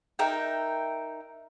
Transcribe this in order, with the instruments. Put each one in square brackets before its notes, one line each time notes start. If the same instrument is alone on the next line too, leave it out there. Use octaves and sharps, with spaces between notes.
[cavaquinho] D#4 A#4 E5 G5